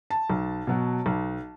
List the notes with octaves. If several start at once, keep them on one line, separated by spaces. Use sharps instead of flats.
A5
B1
B2 F#3
B1